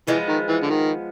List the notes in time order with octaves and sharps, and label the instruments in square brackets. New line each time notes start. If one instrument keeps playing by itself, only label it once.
[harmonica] E3 [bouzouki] F3 G#3 B3
[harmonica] D#3
E3
D3
D#3